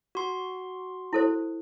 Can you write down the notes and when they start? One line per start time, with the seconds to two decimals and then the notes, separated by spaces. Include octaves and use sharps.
0.15 F#4 C6
1.13 E4 A4 C5